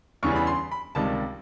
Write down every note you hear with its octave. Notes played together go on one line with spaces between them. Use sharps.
E2 C#3 E3 G3 C#6
B5
C6
B5
C#2 C3 D#3 G3 A5